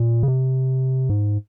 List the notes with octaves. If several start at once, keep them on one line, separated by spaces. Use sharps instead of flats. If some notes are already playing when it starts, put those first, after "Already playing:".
Already playing: A#2
C#3
C3
G#2